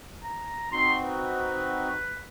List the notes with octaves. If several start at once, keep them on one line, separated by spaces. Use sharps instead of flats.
A#5
C4 D#4 F#4 C6
B4